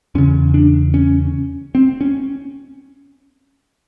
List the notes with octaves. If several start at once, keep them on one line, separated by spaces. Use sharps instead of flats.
E2 C#3 C#4
D4
C#4
C4
C#4